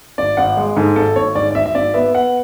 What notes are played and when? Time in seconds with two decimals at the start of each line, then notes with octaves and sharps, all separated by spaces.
0.18 G#1 D5
0.37 G#1 F#5
0.57 G#3
0.77 G#2 A4
0.96 G#1 A4
1.16 G#1 C#5
1.35 G#2 D5
1.51 D5
1.55 G#1 E5
1.66 E5
1.75 G#1 D5
1.94 B3 E5
2.14 B3 F#5